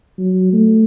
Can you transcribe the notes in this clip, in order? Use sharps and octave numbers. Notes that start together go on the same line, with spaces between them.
F#3
A3